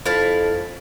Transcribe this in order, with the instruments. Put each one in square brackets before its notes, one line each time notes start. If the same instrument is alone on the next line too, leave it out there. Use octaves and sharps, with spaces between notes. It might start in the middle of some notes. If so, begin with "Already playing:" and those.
[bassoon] F2 [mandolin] E4 F5 A5